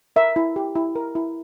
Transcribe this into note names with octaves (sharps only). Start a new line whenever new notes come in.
A#4 E5
E4
G4
E4
A#4
E4